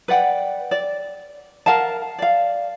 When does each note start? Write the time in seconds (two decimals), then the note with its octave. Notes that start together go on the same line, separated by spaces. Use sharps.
0.08 B4 D5 F#5 G5
0.71 D5
1.66 A#4 F5 F#5 A5
2.19 D5 F5